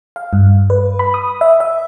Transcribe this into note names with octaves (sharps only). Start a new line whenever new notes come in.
F5
G2
B4
B5
D#6
E5
E5